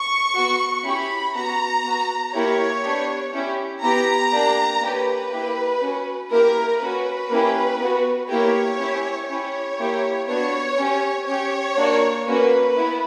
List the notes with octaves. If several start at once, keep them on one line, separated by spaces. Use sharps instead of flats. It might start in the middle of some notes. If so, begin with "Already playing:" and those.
Already playing: C#6
B3 F#4
C#4 E4 G4 B5
B3 F#4 A#5
B3 F#4
A#3 E4 G4 C#5
B3 D4 G4
C#4 E4 G4
B3 E4 G4 A#5
A#3 D4 G4
A#3 C#4 G4 B4
A#3 E4 G4
C#4 F#4
A#3 E4 G4 A#4
C#4 F#4 B4
A#3 C#4 E4 G4
B3 F#4
A#3 E4 G4 C#5
C#4 E4 G4
C#4 E4 G4 C#5
A#3 E4 G4
B3 D4 F#4 C#5
C#4 G4
C#4 G4 C#5
A#3 D4 F#4
A#3 C#4 F#4 B4
B3 E4